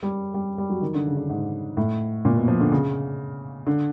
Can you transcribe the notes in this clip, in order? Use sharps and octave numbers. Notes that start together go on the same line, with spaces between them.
G3
G3
G3
F#3
D#3
D3
C#3
D3
G#2
A2
A#2
B2
F3
D3
C#3
D3